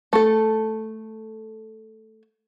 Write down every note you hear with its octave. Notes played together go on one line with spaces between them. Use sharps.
A3 A4